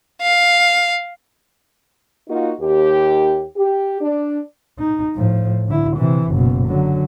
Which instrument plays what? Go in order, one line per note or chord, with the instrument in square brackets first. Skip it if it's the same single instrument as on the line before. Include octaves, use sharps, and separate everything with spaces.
[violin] F5
[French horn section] A#3 D#4 F4 F#4
D#2 G4
G4
D4
[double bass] D#4
A2 F3
D3 E4
C3 E3
F#1 B2
D3 F#3